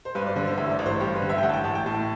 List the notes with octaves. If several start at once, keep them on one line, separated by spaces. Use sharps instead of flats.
C5
G2 B4
D5
D3 B4
C5
A1 E5
D5
A1
C5
G2 G4
B4
D3
E5
G5
A1 F#5
A5
G5
A1 A5
G5
A2 A5